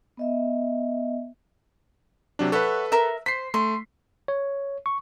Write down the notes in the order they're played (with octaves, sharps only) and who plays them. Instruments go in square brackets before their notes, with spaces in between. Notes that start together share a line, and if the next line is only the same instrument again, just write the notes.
[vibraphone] B3 D#5 E5
[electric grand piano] C3 F#3 D4
[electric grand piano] A4 B4 [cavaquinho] C#5 E5 F#5
[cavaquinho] A#4 E5
[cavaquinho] C5 [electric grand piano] B6 C7
[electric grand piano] A3 [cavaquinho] C6
[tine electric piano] C#5
C#6